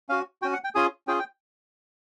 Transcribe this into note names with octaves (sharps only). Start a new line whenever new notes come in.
C#4 F#4 F5
C#4 F#4 G5
F#5
G5
C#4 F4 G#4 G#5
C#4 F4 G#4 G5
G5